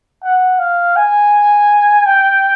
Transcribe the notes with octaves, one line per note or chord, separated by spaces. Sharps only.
F#5
F5
G#5
G5